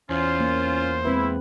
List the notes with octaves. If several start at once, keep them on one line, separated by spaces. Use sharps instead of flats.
E2 C#4 F4 C5
A#3
G#3 C4 E4 B4